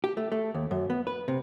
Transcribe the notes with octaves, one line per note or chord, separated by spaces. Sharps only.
G4
A3
A3
D#2
F#2
B3
B4
C3